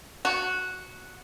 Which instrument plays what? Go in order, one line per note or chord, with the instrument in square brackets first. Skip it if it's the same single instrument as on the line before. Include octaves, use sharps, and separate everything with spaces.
[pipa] F#4